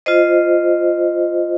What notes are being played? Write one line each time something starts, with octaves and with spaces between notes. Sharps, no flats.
F4 C5 D#5